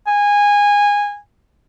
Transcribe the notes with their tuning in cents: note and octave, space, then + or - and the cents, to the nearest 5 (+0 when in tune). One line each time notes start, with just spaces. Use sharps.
G#5 -20